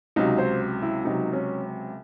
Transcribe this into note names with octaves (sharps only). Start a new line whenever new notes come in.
C#2 C3 F#3 D#4
C5
E4
C#2 C3 F#3 D#4
C#4